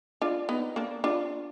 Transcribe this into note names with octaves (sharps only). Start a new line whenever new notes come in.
D4 F4
B3 D#4
A#3 D4
D4 F4